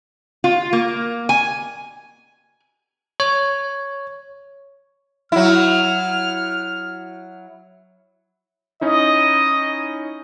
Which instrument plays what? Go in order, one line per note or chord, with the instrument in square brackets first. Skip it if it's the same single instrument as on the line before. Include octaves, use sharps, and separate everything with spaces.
[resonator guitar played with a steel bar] F4
A#3
G#5
[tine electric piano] C#5
[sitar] F#3 E4 [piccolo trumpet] F6
[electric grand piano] C#4 D#4 E4 [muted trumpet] D#5